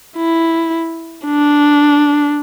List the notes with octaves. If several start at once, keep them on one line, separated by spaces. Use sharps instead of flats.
E4
D4